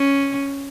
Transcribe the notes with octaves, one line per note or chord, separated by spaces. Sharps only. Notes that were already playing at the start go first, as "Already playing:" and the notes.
Already playing: C#4